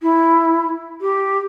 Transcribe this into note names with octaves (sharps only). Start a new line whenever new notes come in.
E4
G4